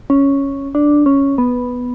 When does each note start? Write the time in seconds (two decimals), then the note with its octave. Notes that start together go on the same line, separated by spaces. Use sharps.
0.10 C#4
0.75 D4
1.06 C#4
1.38 B3